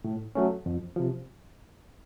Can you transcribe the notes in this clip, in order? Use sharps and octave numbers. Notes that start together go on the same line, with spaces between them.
A2
F#3 A3 C#4
F2
C3 F3